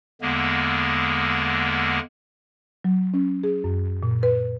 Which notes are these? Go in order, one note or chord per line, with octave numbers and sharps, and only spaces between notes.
E2 D3 G#3 A#3 B3
F#3
C#4
G#4
F#2
A#2
B4